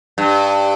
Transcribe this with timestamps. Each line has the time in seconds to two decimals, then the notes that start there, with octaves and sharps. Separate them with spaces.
0.18 G2